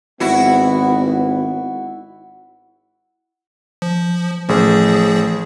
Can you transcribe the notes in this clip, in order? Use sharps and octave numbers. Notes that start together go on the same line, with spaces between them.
G#1 B3 E4 F#4
F3
A1 F3 G#4